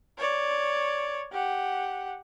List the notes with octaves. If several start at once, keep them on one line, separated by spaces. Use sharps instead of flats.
C#5 D5
G4 F#5